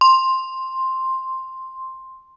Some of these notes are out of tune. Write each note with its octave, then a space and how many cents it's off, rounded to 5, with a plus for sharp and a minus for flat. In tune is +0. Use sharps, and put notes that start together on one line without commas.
C6 +5